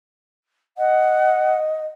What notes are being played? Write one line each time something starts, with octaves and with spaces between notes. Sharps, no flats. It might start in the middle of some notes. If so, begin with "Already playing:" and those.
D#5 F#5